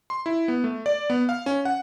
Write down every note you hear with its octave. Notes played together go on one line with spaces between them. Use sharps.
C6
E4
B3
A3
D5
B3
F5
C#4
F#5